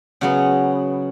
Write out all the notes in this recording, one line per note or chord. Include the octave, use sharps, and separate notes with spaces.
C#3 F#3 B3 F#4